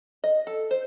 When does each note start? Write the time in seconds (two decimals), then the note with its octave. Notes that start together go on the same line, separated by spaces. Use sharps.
0.24 D#5
0.47 A4
0.71 C5